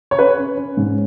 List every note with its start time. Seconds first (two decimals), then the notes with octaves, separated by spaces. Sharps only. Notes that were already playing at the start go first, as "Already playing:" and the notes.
0.11 C#5
0.18 C#4 B4
0.38 C#4
0.57 C#4
0.77 G#2